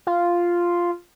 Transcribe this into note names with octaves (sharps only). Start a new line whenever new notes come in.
F4